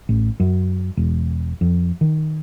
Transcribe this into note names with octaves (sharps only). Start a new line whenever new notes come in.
A1
F#2
E1
F2
D#3